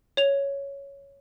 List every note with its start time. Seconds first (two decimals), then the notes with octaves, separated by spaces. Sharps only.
0.17 C#5 F7